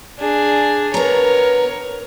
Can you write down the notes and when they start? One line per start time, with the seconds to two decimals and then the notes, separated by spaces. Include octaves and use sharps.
0.19 D4 G#4
0.94 B3 A#4 C#5 A#5